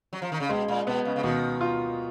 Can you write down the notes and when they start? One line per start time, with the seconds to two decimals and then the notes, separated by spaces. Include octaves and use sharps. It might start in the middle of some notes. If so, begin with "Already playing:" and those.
0.13 F#3
0.22 F3
0.32 D#3
0.40 C#3
0.49 B2 G#3
0.68 A#2
0.87 B2 B3
1.05 C#3
1.16 C#3
1.23 B2 D#3
1.61 F4